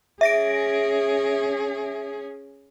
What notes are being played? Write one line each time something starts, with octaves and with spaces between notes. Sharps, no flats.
C#4 G#4 E5 A#6 D7